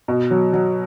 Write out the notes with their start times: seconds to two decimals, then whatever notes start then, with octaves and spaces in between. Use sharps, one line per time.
0.08 B2
0.31 F#3
0.53 F#3